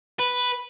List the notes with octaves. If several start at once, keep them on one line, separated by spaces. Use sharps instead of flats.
B4